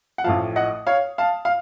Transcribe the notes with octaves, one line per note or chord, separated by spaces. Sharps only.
F#5
A1 A2 F3 F5 A5
D#5 F#5
C#5 F5
F5 A5
F5